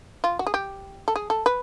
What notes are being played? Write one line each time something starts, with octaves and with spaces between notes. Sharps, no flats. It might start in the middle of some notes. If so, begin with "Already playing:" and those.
F4
F#4
G#4
G4
A4
G#4
A4
B4